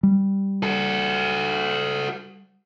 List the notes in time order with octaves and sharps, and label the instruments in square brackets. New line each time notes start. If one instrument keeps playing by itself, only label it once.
[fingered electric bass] G3
[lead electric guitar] F#4 A4